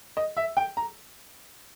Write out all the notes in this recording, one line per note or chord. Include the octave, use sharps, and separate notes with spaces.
D#5
E5
G5
A#5